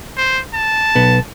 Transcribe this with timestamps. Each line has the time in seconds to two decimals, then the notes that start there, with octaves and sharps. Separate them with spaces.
0.17 C5
0.54 A5
0.95 B1 B3